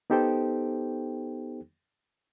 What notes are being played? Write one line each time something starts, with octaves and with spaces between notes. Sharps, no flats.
B3 D#4 G4 A4 C5 G5